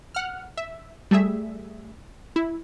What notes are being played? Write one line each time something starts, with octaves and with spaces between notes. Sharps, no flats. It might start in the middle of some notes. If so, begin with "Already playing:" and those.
F#5 F6
E5
G3 A3 G#4 E5
E4